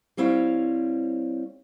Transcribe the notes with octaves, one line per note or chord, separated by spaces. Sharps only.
G3 C4 E4 C#5 F5